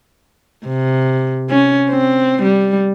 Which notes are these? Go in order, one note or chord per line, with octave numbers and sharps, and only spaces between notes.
C3
C#4
C4
G3